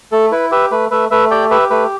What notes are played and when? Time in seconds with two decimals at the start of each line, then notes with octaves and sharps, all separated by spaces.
0.12 A3 A4
0.31 E4 B4
0.51 G4 B4 E5
0.71 A3 B4
0.91 A3 B4 E5
1.11 A3 B4 E5
1.31 G4 D5 G5
1.50 G4 B4 E5
1.70 A3 B4